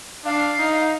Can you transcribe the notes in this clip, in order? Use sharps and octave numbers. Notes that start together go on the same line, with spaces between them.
D4 F5
D#4